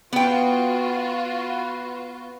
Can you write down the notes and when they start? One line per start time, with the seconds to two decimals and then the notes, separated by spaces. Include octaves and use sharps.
0.13 B3 F4 F#4 B4 G5